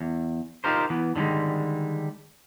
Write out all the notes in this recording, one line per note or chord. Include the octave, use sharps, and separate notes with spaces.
E2
D#4 F4 G4 A#4 C5
E3 B3
D3 D#3 F3 G3 G#3